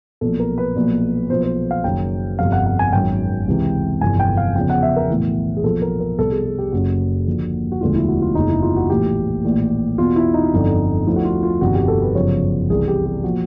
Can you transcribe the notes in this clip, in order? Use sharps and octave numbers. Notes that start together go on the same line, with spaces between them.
B1 A#2 F3 A4
A#4
B4
B1 A#2 F3
B1 A#2 F3 C5
C5
F5
F#1 F#2 D#3 G5
G1 F2 C3 F5
F#5
F#5
G#5
G#1 F#2 D#3 G5
C#2 C3 E3
G1 F2 C3 E3 G#5
G5
F5
E2 C#3 F3 G5
F#5
E5
A#4
B1 A2 E3
G#4
B1 A#2 F3 A4
A#4
A#4
C2 B2 A4
G#4
G#4
G4
F#1 F#2 C#3 F#4
D#2 D3 F3
F#4
E1 D2 D3 F3 F4
E4
F#4
F4
F#1 E2 C#3 D#4
E4
F4
F#4
A#1 A2 E3 G4
A#1 A2 E3
E2 B2 F4
E4
D#4
G1 F2 D3
D2 D3 F3 E4
F#4
F4
F4
G1 F2 C3 D#3 F#4
G4
A4
B4
G1 F#2 C#3 F3 C#5
C2 C3 E3 G#4
G4
G4
A#2 F3 F#4